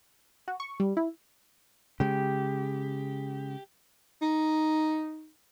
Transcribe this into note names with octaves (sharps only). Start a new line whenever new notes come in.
F#4
C#6
G3
E4
C#3 G#3 G4
D#4